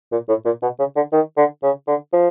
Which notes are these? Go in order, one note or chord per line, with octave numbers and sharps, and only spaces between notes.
A#2
A2
A#2
B2
C#3
D3
D#3
D3
C#3
D3
F3